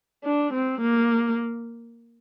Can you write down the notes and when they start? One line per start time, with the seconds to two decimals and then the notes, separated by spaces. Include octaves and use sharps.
0.25 D4
0.53 C4
0.81 A#3